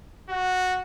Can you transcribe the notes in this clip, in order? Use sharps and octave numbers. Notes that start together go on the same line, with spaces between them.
F#4